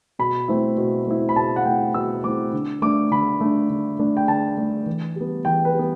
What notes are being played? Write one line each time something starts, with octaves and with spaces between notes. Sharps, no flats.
B2 B5
A3 C4 E4
B2
A3 C4 E4
B5
B2 A5
F#5
A3 C4 E4 G5
B2 E6
A3 C4 E4 D6
D3
A3 D4 D6
D3 B5
A3 D4
D3
A3 D4
G5
D3 A5
A3 D4
E3
G3 B3
E3 G5
B4
G3
B3